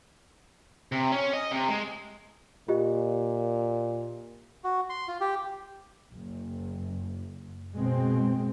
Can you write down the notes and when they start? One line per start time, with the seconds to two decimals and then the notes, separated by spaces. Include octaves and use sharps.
0.92 C3
1.12 C#4
1.33 D#5
1.51 C3
1.69 G#3
2.68 A#2 F4 G4 D#5
4.64 F#4
4.90 C6
5.08 F4
5.21 G4
6.11 F#1
7.76 B2 G#3 C4